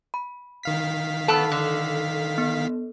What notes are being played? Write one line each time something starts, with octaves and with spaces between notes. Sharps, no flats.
B5
D#3 F5 B6
B3 A4 A5 E6
D3
B3